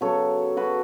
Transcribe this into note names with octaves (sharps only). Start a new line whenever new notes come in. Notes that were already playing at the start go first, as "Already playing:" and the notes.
C#3 F#3 B3 A4 C#5
F#4 B4